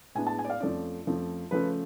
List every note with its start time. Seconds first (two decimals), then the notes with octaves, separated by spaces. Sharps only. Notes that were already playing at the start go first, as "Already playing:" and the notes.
0.15 A2 G#3 B3 D4 G#5
0.27 A5
0.39 G#5
0.45 D5
0.50 F5
0.60 F2 F3 A3 C#4 D5
1.06 F2 F3 A3 C#4
1.51 C#3 F3 A3 C#4 B4